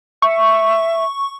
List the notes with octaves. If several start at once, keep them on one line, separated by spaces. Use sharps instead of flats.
E5 C#6